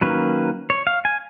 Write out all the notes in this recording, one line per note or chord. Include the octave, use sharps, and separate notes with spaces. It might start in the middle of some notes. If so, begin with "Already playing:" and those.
D#3 F#3 A#3 C#4 B4
C#5
F5
G#5